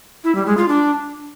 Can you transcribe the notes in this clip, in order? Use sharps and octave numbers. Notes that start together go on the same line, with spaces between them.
E4
G3
G#3
F4
D4